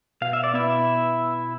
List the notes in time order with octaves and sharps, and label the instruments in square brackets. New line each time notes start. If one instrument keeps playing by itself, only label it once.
[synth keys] B2 [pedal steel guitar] F5
[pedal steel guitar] E5
D5
[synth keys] B3 [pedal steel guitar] E4 E5